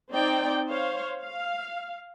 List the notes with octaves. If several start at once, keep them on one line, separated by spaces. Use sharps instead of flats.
C4 D#4 D5 G5
C5 C#5 F5
F5